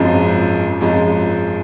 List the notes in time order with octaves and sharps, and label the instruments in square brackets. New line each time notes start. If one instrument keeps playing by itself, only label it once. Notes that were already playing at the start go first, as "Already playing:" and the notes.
Already playing: [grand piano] G#1 F#2 F3 G#3
G#1 F#2 F3 G#3